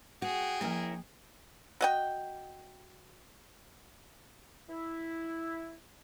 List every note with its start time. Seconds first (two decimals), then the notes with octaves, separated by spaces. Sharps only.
0.22 F#4 G#4 G5
0.61 F3 A#3 C#4 E4 A#4
1.81 F#4 D#5 G5
4.69 E4